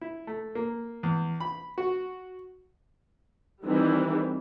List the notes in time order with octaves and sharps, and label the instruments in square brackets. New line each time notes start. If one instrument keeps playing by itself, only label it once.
[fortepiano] E4
A3
A#3
E2
B5
F#4
[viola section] D#3 E3 G3 C4